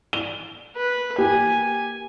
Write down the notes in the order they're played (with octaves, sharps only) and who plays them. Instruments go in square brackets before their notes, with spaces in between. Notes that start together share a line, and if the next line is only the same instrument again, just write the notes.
[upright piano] G7
[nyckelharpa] B4
[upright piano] A#3 G4 [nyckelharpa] G#5